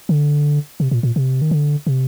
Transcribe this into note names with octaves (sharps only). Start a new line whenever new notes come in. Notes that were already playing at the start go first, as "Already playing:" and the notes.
D3
C3
A#2
A#2
C3
D#3
D3
C3